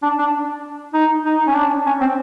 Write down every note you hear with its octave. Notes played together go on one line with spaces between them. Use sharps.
D4
D4
D#4
D#4
C#4
D4
C#4
C4